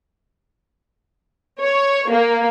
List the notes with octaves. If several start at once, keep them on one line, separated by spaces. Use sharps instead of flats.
C#5
A#3